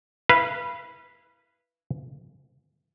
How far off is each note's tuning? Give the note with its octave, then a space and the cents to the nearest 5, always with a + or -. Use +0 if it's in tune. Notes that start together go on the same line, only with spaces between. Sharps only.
E4 -5 B4 -10 F5 -35